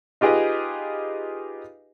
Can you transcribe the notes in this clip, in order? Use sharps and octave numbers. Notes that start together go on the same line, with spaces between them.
D#4 F4 G4 G#4 B4 D#5